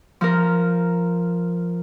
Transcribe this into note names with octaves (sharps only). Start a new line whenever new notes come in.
F3 A#4